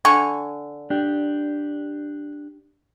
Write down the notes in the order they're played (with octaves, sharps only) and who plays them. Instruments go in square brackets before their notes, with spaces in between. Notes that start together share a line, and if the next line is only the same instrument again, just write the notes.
[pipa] D3 G#5 C#6
[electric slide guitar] D4 G4